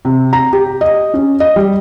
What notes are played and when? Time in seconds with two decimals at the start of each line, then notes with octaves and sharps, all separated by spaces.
0.05 C3
0.33 A#5
0.53 G4
0.81 D#5
1.14 C#4
1.40 D#5
1.56 G3